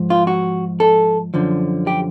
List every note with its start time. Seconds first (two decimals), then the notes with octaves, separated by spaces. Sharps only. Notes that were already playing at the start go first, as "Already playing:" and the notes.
Already playing: G#2 F3
0.10 F4
0.27 F#4
0.80 A4
1.34 F#2 D3 F3
1.87 G4